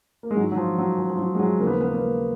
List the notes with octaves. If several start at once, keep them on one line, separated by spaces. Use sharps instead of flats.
A#3
G#3
G#2 D#3 F#3
F#3
F3
F#3
F3
F3
F#3
G#3
F#3
D#2 C#3 F3 A#3
B3
A#3
B3
A#3
B3
A#3